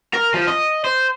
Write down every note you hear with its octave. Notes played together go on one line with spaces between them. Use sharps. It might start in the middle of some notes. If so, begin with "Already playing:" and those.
A#4
F3
D#5
C5